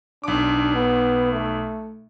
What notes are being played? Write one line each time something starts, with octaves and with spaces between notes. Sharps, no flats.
B1 D4 D6
B3
A3